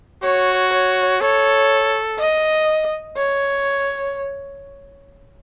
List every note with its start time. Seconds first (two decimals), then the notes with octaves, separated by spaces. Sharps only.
0.23 F#4 C#5
0.72 C#5
1.21 A4 C#5
2.18 D#5
3.16 C#5